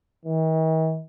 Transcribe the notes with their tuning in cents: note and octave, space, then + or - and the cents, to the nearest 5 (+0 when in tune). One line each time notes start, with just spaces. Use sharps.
D#3 +45